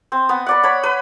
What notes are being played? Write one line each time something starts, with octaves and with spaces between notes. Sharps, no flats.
C4
B3
B4 D5 F#5
C#5 B5
B4